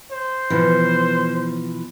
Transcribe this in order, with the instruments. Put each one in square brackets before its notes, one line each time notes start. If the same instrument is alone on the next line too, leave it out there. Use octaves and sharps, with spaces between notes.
[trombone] C5
[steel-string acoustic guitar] B2 E3 F3